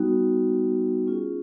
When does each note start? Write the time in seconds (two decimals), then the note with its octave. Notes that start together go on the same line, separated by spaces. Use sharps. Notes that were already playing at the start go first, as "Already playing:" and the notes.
Already playing: G3 B3 D#4 F#4
1.07 C#4 F4 G#4